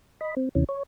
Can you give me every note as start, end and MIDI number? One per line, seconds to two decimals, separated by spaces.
0.21 0.35 75
0.21 0.35 83
0.37 0.49 60
0.55 0.64 39
0.55 0.64 48
0.55 0.64 52
0.55 0.64 61
0.69 0.83 73